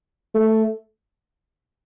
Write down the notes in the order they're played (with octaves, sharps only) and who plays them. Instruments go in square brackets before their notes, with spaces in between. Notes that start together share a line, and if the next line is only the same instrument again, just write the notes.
[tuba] A3